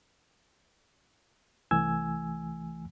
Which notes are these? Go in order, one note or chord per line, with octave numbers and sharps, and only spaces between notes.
C2 E3 A3 G#5 E6 G#6